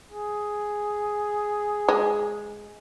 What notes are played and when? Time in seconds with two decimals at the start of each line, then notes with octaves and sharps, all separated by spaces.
0.10 G#4
1.88 G#3